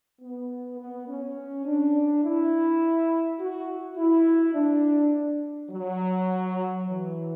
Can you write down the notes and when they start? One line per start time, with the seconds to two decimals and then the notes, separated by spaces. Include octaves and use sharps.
0.21 B3
0.80 B3
1.08 C#4
1.66 D4
2.24 E4
3.39 F#4
3.97 E4
4.54 D4
5.70 F#3
6.86 E3